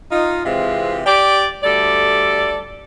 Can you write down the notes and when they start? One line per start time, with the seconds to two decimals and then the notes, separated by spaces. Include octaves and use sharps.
0.12 D#4 F4
0.45 C3 E3 G#3 C4 F4
1.06 G4 D5
1.63 D2 G3 A4 D5